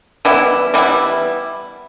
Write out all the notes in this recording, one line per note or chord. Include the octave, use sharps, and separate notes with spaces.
E3 G3 B3 E4
E3 G3 B3 E4